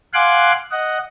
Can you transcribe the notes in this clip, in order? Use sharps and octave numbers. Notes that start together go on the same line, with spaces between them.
F5 F#5 G#5 C6 D6 F#6
D#5 F#5